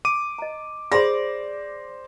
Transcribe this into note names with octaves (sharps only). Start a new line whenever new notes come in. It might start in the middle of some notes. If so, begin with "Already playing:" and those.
D6 D#7
D#5 A#5
G#4 C5 D5 B5 C6 A#6